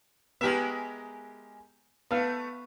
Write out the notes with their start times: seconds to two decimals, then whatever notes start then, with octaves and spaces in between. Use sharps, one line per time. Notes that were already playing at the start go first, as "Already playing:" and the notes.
0.41 G#3 B3 G4 A#4 E5
2.11 A3 B3 F5